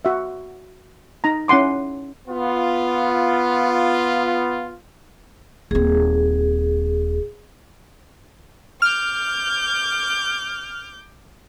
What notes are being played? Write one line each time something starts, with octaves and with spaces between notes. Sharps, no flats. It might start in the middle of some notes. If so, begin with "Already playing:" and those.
F#4 E5
D#4 A#5
C#4 E4 F#5 C6 D6
B3 F4
D#1 C4 G#4
D6 F6 G6